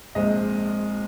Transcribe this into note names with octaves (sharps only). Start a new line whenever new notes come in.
A#1 G#2 G#3 C4 D#5